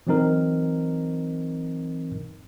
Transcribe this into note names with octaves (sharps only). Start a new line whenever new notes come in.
E3 F#3 C4 D#4 A#4